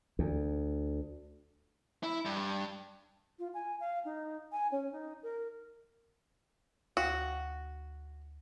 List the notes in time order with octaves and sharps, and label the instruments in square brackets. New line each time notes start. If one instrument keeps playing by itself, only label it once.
[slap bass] D2
[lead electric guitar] E4
G2
[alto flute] F4
G#5
F5
D#4
G#5
C#4
D#4
A#4
[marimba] D2 F5 G5 [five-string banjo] F#4